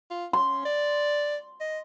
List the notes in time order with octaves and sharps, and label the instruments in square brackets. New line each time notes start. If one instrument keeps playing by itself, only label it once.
[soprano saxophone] F4
[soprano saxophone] C#4 [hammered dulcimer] C6
[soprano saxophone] D5
D#5